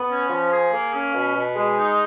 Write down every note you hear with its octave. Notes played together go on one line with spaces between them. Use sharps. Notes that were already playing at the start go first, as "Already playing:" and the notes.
Already playing: B3
C#4
F3
G#4
A#3
C#4
B2
B2
G#3
D#4